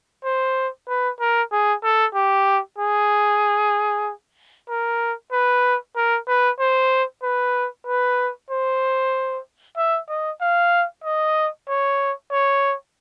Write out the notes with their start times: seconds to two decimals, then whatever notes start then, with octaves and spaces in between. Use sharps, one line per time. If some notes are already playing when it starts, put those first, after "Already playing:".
0.24 C5
0.88 B4
1.20 A#4
1.52 G#4
1.84 A4
2.15 G4
2.78 G#4
4.69 A#4
5.32 B4
5.96 A#4
6.28 B4
6.59 C5
7.23 B4
7.87 B4
8.50 C5
9.77 E5
10.09 D#5
10.41 F5
11.04 D#5
11.68 C#5
12.31 C#5